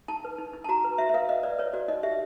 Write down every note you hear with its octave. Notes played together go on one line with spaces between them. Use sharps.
D#4 A5
B4
D#4
D#4
A5
F#4 A#5
B4
F#4 E5
E5
B4 F5
B4 D#5
B4 D5
B4 C#5
F#4 D5
D#4 D#5
G4 E5